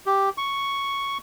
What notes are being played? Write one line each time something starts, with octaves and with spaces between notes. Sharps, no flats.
G4
C#6